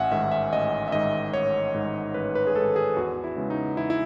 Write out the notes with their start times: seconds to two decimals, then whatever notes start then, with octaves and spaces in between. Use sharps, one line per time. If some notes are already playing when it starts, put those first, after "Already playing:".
Already playing: A1 E5 F#5 G#5
0.11 G#2 D#3 E5
0.32 E5
0.52 A1 D#5
0.88 E5
0.92 G#2 D#3 D#5
1.33 A1 C#5
1.74 G#2 D#3
2.14 A1 B4
2.35 B4
2.47 G#4
2.55 G#2 D#3 A4
2.76 G#4
2.97 E2 F#4
3.24 E4
3.37 C#3 G#3 B3
3.50 D#4
3.77 E2 E4
3.90 E4